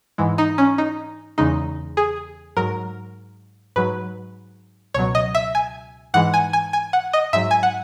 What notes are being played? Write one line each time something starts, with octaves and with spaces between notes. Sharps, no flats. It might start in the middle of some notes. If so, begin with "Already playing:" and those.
G#2 E3 G#3
D#4
C#4
D#4
E2 C#3 G#3 D#4
G#4
G#2 F#3 A#4
G#2 F#3 B4
C#2 B2 F#3 C#5
D#5
E5
G#5
G#2 E3 G#3 F#5
G#5
G#5
G#5
F#5
D#5
G#2 F#3 E5
G#5
F#5